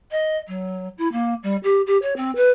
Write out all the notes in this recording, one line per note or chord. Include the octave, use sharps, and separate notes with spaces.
D#5
F#3
E4
A#3
G3
G4
G4
C#5
C4
B4